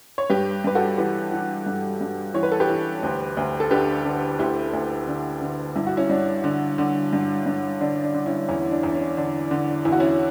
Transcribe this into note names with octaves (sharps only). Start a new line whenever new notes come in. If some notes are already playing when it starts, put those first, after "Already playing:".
C#5
G2 G4 B4
G2 B4
F#4 A4
E3 G4 B4
E3
G2
G2
E3 C#5
B4
A4
G4 B4
E3
D2
D2
A4
D3 G4 B4
D3
D2 E4 G4
D2
D3
D3
G2 E4
F#4
C#4 E4
G2 D4
D3
D3
G2
G2
D3 D4
D4
D3
C#4 E4
E2 C#4 E4
D4
E2
C#4
D3 D4
D3
E2 E4
F#4
C#4 E4